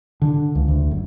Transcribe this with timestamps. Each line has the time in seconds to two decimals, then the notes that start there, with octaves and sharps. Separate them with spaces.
0.22 D3
0.55 C#2
0.68 D2
0.91 F#1